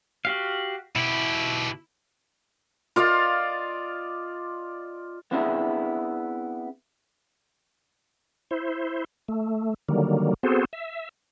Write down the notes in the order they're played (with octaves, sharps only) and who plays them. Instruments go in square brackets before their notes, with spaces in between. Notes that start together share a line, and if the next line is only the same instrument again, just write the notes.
[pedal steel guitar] F#4 G4 F5
[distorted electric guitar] B2 G4 [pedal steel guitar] E4
[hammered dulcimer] F4 D5 D#5 F5
[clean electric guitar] B3 C4 D4 E4 G#4
[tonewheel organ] E4 C5
A3
D3 D#3 F#3 G3 A#3
B3 C4 F#4 G#4 A4 C5
E5